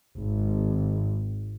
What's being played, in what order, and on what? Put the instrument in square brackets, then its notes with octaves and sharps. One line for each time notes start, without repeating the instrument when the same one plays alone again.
[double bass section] G#1